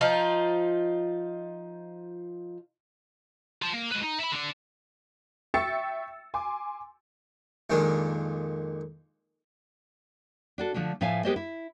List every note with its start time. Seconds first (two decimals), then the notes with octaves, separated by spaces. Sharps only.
0.01 F3 D#4 F4
3.62 F4 A5
3.74 A#3
3.92 G#3 B4
4.04 D#4
4.19 E5 B5
4.32 D3 D4
5.54 E5 G5 C#6 E6 A6 C#7
6.34 G#5 C6 D6
7.70 F2 A#2 D#3 G#3 D4
10.58 D4 F#4 A4
10.74 D3 F3 A3 D4
11.01 A2 F3 A4 E5 F5 G#5
11.25 G#3 B3 G4 A#4 C5 D#5
11.36 E4